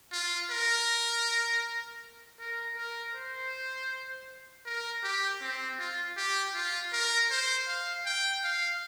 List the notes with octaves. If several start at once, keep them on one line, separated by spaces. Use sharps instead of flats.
F4
A#4
A#4
A#4
C5
A#4
G4
C4
F4
G4
F4
A#4
C5
F5
G5
F5